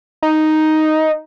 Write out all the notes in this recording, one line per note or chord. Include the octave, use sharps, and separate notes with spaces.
D#4